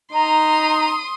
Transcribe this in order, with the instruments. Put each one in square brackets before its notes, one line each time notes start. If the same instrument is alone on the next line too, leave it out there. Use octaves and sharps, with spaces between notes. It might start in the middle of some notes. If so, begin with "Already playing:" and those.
[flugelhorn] D#4 [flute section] A#5 [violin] C6 D#6